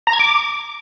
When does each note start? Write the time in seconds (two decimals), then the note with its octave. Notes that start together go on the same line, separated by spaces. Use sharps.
0.07 A#5
0.13 G#6
0.19 D6